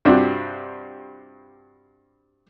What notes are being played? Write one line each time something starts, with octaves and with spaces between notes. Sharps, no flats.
G2 C3 C4 D4 F4 F#4